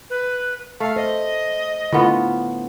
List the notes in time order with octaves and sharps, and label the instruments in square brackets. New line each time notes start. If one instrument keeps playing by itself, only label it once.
[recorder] B4
[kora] A3 [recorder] F5
[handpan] C5 [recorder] D#5
[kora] A2 B3 F4 [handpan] D3